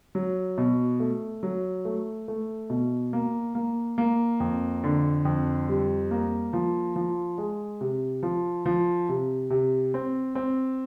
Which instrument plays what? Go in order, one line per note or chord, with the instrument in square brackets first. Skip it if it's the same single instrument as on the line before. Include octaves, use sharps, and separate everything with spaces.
[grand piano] F#3
B2
A3
F#3
A3
A3
B2
A#3
A#3
A#3
F2
D3
F2
G3
A#3
F3
F3
G#3
C3
F3
F3
C3
C3
C4
C4